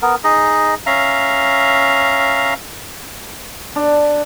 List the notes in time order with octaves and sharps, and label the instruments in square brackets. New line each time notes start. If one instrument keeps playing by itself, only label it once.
[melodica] B3 A#4
D#4 G#4 D#5
C#4 E5 F5 A#5
[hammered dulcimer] D4